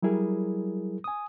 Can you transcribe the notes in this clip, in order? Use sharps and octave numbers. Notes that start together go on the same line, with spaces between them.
F#3 G3 E4 G#4 A#4
G#5 D#6